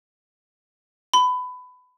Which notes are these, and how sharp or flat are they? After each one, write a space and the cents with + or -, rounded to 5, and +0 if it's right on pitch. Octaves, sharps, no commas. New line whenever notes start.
B5 +20